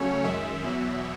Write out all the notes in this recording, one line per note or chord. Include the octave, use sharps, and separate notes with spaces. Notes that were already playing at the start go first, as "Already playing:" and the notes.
Already playing: C#3 F#3 A3 C#4 C#5
F#2 D#3 G#3 E5
E2 B2 F#3